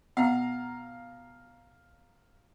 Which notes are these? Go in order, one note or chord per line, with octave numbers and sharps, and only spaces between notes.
B2 F5 F#5 A#5